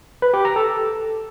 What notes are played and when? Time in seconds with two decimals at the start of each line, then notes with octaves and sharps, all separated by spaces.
0.22 B4
0.34 G4
0.45 A#5
0.56 A4